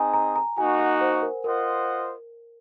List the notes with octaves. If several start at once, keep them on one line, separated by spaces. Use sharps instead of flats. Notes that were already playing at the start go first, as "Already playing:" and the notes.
Already playing: C4 D#4 G#4 D#5 G#5 A#5
A#5
A#5
A#3 D#4 F#4 G#5
F#5
C5
A#4
F4 A#4 C5 D#5 F#5